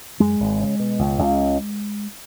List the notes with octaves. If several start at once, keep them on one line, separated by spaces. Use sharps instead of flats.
F#2 G#3
G#1
C#3
B2
C#2
C#2